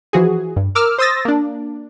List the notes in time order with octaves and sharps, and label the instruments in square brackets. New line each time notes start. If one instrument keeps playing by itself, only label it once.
[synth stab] E3 F3 F#4 G#4
G2
A#4 D6 E6 F6
C5 C6 D#6 E6 A6 A#6
A#3 D4